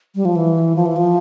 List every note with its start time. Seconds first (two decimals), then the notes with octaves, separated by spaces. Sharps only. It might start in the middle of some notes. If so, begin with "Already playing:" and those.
0.15 G3
0.25 F3
0.36 E3
0.76 F3
0.86 E3
0.96 F3